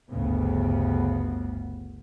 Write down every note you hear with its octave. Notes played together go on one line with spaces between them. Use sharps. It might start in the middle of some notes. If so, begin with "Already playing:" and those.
G1 D2 G2 C#3 B3